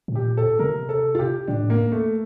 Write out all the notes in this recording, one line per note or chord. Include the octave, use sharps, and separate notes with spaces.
A2
A#2 G4
A4
C3 A#4
A4
F4
G4
A2 D4
A#3
A3